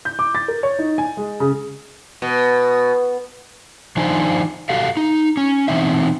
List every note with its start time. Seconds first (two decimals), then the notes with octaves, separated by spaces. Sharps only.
0.05 G6
0.19 D6
0.35 A6
0.48 A#4
0.63 C#5
0.79 D#4
0.98 G#5
1.17 G#3
1.40 C#3
2.22 B2
3.97 D#3 F3 D4 D#4 C5 G#5
4.69 F#4 G4 A4 F5
4.97 D#4
5.37 C#4
5.68 B2 E3 C4 D#4 E5